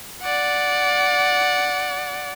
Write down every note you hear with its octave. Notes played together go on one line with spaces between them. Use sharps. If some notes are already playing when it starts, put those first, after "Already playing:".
D5 F#5